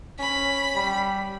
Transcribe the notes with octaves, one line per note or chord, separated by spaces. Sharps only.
C#4 B5
G3